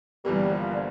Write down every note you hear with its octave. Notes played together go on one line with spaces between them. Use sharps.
G1 G2 E3 G3 A#3
F3
D3